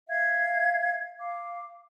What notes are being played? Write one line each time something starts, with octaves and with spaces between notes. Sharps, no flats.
E5 F5 G#6
F5 D6